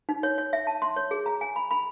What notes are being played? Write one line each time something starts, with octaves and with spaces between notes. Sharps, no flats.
D#4
C#5
C#5
E5
A5
C6
C#5
G#4
A#5
G#5
B5
B5